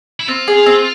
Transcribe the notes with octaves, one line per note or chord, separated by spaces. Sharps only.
E4
C4 F4
G#4
C4